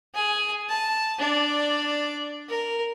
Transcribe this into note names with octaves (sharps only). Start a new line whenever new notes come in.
G#4 G#5
A5
D4 D5
A#4